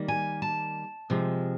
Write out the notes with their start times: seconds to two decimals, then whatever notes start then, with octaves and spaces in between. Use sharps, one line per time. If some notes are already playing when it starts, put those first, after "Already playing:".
Already playing: D#3 G3 A#3
0.08 G#5
0.42 A5
1.10 C3 F3 G#3